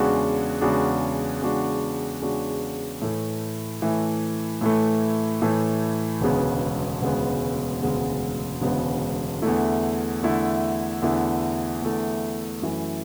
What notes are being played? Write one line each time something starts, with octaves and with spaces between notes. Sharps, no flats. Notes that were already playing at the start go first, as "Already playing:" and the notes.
Already playing: E2 C#3 G#3 D4 F#4
E2 C#3 G#3 D4 F#4
E2 C#3 G#3 D4 F#4
E2 C#3 G#3 D4 F#4
A2 E3 A3
A2 E3 A3
A2 E3 A3
A2 E3 A3
E1 D2 C#3 G#3 B3
E1 D2 C#3 G#3 B3
E1 D2 C#3 G#3 B3
E1 D2 C#3 G#3 B3
E2 D3 A3 E4
E2 D3 A3 E4
E2 D3 A3 E4
E2 D3 A3 E4
F#2 E3 A3 E4